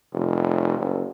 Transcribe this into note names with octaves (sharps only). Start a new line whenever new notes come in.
F1
F#1